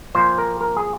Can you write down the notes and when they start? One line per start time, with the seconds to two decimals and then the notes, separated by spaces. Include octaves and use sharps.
0.15 A#2 F3 C5
0.38 A#4
0.61 A#4
0.77 G#4